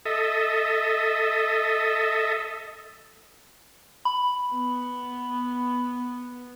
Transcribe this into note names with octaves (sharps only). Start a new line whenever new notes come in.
A4 D#5 E5
B5
B3